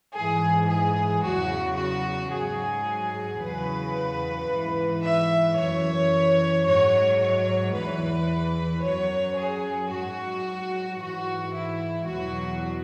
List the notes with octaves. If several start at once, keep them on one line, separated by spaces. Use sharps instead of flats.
G#2 E3 G#4
G#4
E2 C#3 F#3 F#4
F#4
G#2 F#3 G#4
E2 C#3 F#3 B4
G#2 E3
E5
F#2 E3 C#5
G#2 F#3 C#5
C#5
E2 E3 B4
F#2 F#3 C#5
G#4
G#2 F#3 F#4
G#2 E3 F#4
E4
E2 B2 F#3 F#4